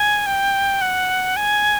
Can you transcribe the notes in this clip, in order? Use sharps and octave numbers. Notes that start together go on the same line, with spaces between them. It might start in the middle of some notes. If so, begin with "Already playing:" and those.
Already playing: G#5
G5
F#5
G#5